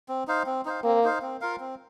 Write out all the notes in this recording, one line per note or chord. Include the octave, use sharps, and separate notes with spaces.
C4
D#4 C5 F5
C4
D#4 C5 F5
A#3 C4
D#4 C5 F5
C4
F4 A#4 F5
C4